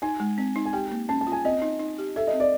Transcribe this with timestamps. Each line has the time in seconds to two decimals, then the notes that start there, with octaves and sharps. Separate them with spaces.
0.02 D#4 G#5
0.20 G#3
0.38 C4
0.56 D#4
0.66 G#5
0.73 G4 G5
0.91 A#3
1.09 C#4 A5
1.21 A5
1.27 F4
1.32 G#5
1.45 C4 D#5
1.62 D#4
1.79 D#4
1.98 G4
2.16 A4 E5
2.27 D#5
2.33 C4
2.40 D5